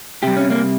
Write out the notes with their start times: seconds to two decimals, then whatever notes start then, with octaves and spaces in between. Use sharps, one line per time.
0.23 C3 G3 G4
0.37 C#4
0.50 A#3